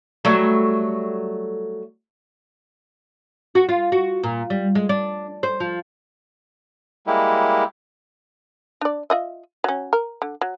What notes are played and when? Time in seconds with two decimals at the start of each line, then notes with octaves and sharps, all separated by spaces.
0.25 F#3 G3 A3
3.55 F#4
3.69 F4
3.92 F#4
4.23 A#2
4.50 G3
4.75 G#3
4.89 D4
5.43 C5
5.60 F3
7.07 G3 G#3 A#3 E4 G4
8.81 D4 D5
9.10 F4 D#5 E5
9.64 F#3 C#4
9.93 A#4
10.22 D3
10.41 F#3